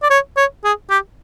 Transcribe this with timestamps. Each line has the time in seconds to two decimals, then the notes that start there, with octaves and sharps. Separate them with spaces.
0.03 D5
0.10 C#5
0.37 C#5
0.64 G#4
0.90 G4